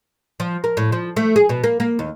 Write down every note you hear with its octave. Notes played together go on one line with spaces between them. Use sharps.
F3
A#4
A2
F3
A3
G#4
B2
A#3
A#3
D#2